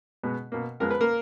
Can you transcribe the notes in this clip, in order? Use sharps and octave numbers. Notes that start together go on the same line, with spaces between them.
B2 G#3 B3
B2 A#3
F2 F3 G#3 B3 A#4
B4
A#3 A#4